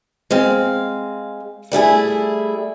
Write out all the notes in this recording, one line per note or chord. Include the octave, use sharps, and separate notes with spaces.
G#3 C4 F5
G3 A3 E4 G#4